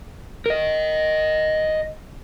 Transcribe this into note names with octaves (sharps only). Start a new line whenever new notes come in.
A#4 D#5